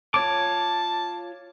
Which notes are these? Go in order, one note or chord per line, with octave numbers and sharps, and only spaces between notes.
F4 C#5 A5 D6